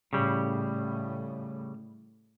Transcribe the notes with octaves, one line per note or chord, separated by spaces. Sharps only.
A2 C#3 G3